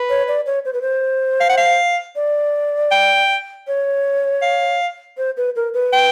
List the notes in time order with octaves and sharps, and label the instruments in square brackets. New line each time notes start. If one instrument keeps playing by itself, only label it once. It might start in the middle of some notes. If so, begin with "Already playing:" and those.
Already playing: [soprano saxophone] B4
[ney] C#5
D5
C#5
C5
B4
C5
[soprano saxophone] F5
F#5
F5
[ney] D5
[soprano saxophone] G5
[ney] C#5
[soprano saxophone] F5
[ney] C5
B4
A#4
B4
[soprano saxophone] G5